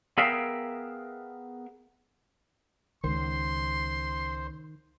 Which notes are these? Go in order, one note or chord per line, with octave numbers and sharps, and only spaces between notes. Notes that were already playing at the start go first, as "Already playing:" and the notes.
B3 G#4 A#4 E5 F5 G5
C#2 D#3 C5 C6